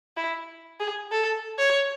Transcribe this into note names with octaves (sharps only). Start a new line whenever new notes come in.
E4
G#4
A4
C#5